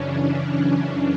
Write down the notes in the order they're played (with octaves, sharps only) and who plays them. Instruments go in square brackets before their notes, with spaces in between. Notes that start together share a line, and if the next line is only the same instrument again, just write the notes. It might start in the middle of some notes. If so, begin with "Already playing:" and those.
Already playing: [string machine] F#2 C#3 E3 C#4 D4
D4